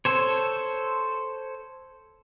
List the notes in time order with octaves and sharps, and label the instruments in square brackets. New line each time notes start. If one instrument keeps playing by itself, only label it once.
[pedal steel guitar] A4 C5 C#5